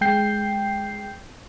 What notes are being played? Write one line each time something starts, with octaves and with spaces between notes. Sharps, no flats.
G#3 G5 G6 C7